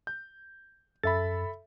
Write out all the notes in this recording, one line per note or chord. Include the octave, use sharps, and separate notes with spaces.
G6
F#2 A4 E5 B5 A6